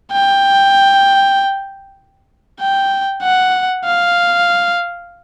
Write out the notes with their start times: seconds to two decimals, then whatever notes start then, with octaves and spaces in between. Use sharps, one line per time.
0.12 G5
2.61 G5
3.23 F#5
3.85 F5